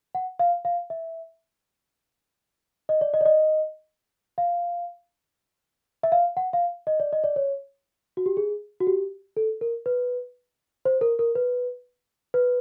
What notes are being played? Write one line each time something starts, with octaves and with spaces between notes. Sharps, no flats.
F#5
F5
F5
E5
D#5
D5
D#5
D5
D#5
F5
E5
F5
F#5
F5
D#5
D5
D#5
D5
C#5
F#4
G4
G#4
F#4
G4
A4
A#4
B4
C5
A#4
A#4
B4
B4